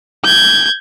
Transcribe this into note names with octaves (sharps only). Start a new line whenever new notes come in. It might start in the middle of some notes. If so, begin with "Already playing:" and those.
G6 G#6